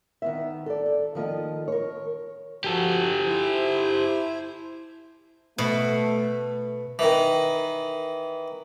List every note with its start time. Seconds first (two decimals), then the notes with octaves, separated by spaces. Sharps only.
0.22 D#3 B3 E5
0.66 A4 D5
0.86 A4
1.15 D#3 F3 A#3 D#5
1.68 A#4 C#5
2.64 F3 F#4 G4 A4
3.25 E4 C5
5.58 B2 A3
6.99 D#3 E3